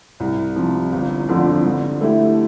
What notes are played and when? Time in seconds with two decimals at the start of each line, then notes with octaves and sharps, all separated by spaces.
0.20 C2
0.56 C3 F3
0.92 G1
1.28 F2 D3 F3 C4
1.65 D3
2.01 A3 E4 G4